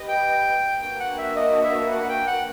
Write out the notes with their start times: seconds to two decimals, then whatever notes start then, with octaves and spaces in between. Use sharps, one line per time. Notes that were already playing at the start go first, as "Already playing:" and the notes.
Already playing: G4 B4 D#5
0.09 G5
0.81 A#3 D4 F#4 B4 G5
1.00 F#5
1.18 E5
1.36 D#5
1.63 E5
1.90 F#5
2.09 G5
2.27 F#5